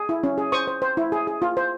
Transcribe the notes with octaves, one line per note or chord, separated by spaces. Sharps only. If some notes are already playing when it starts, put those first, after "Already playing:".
Already playing: G#4
E4
C#4
G#4
C5 C#6 D#6
C5
C5
E4
G#4
G#4
F4
C5